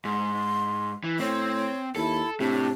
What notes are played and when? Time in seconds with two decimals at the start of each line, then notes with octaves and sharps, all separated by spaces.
0.05 G#2 C6
1.04 E3
1.19 A2 C4 C#5
1.96 D#2 E4 A4
2.40 A2 C3 D4